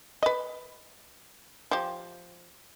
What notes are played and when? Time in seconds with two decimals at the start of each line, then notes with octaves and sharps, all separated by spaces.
0.23 B4 D#5
1.71 F3 G4